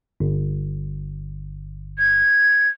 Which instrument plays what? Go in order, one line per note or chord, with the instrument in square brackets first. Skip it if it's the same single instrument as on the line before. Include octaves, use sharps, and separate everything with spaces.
[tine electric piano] G1
[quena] G#6